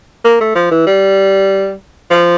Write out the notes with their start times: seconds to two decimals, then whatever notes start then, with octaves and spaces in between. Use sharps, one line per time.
0.25 A#3
0.41 A3
0.55 F3
0.71 E3
0.87 G3
2.10 F3